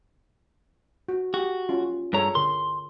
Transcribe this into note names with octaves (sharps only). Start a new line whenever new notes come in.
F#4
F#4 G4
C#4 F4
G2 G#4 A4 C#5 A#5
D3 A#4 C6